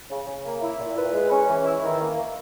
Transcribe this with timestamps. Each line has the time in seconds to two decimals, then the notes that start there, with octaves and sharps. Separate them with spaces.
0.09 C#3
0.27 C#3
0.45 A#3
0.61 E4
0.78 A#2
0.96 B4
1.13 G#3
1.30 C#4
1.48 E3
1.66 E4
1.83 D#3
2.00 A#3